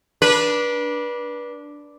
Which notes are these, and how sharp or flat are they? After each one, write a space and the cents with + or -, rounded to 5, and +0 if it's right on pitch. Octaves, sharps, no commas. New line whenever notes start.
D4 -5 B4 -30